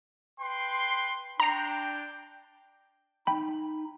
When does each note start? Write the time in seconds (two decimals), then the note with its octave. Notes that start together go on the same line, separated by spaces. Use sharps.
0.40 B4 G5 C6
1.40 D4 G5 A#5 C7
3.27 D#4 G5 B5